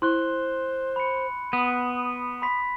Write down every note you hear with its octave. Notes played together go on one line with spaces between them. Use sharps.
E4 C5 C6 F#6 G7
B5 C#7
B3 D#6
B5 C6 B6